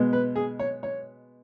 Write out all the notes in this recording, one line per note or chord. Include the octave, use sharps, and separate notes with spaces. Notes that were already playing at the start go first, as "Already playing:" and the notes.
Already playing: B2 G#3 B3
B4
G#4
C#5
C#5